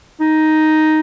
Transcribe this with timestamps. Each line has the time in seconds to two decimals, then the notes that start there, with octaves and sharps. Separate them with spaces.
0.21 D#4